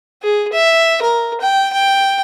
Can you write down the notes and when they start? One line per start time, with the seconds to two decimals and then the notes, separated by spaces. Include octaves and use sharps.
0.23 G#4
0.53 E5
1.02 A#4
1.41 G5
1.72 G5